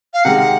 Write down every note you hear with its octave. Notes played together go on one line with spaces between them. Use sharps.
F5
C3 D#3 G#3 F#5